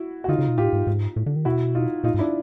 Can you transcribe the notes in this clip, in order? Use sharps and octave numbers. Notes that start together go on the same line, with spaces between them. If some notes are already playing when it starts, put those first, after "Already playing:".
Already playing: E4 F#4
F#4
D3 D#4 F4
C#3
B2
A2 F4 G4
G#2
G#2
A2
D3
D#3
B2 E4 F#4
D#4 F4
A#2 D#4 F4
G#2
D4 E4